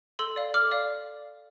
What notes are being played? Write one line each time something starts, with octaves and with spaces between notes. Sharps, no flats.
A4 C6 E6
D5 F5
A4 D6 F6
D5 F5